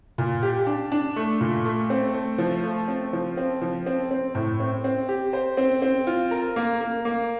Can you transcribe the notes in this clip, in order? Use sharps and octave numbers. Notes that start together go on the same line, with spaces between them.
A#2
G4
D4
D4
A3
A#2
A3
C4
A3
F3
A3
C4
F3
C4
F3
C4
C4
A2
C4
C4
G4
C5
C4
C4
F4
A#4
A#3
A#3
A#3